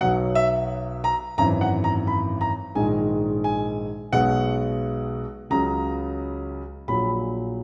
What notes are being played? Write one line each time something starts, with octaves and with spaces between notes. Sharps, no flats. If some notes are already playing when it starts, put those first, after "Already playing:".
B1 B2 F#3 F#5
E5
A#5
G#1 F#2 E3 A#5
F#5
A#5
B5
A#5
A#1 G#2 D#3 G#3 G#5
G#5
B1 B2 G#3 F#5
C#2 C#3 F#3 A#5
A#1 A#2 F#3 B5